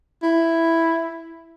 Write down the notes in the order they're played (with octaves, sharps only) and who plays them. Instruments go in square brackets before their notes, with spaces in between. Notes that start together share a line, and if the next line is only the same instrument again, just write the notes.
[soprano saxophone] E4